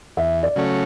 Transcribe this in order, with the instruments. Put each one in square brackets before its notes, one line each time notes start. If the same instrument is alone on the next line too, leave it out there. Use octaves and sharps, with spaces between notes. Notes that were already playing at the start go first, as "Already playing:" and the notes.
[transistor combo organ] E2 [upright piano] E5
[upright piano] D5
[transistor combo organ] C#3 F#3 A3 C#4